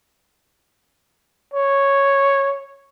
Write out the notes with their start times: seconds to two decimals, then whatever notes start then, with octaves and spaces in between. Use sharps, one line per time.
1.54 C#5